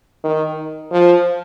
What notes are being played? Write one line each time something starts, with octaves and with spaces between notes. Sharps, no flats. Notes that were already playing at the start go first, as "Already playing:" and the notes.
D#3
F3